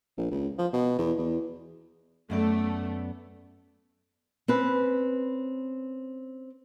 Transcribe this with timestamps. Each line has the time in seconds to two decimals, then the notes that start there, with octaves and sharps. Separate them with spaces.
0.18 A#1
0.31 C#2
0.58 F3
0.73 B2
0.98 E2
1.18 E2
2.30 F#2 A3 B3 D5
4.48 C4 C#4 B4